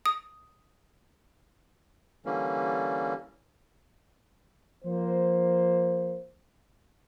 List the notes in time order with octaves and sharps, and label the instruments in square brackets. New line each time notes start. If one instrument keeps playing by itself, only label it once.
[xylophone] D#6
[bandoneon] D3 E3 G3 A#3 C#4
[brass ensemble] F3 A#3 C5